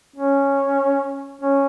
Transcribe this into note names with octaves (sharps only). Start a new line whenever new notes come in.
C#4
C#4